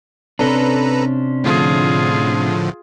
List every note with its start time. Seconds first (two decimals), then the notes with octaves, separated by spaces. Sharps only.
0.39 C3 C#4 D4 A4 B4 A#5
1.44 A2 D3 F3 F4 G#4